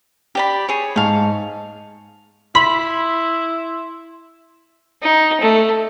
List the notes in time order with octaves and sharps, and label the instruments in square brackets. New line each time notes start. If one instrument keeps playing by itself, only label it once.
[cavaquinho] G4 D5 B5
G#4 C#5
[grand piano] G#2 A5 [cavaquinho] F5 C#6
[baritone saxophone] E4 [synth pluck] B5 [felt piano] C6
[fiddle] D#4
A3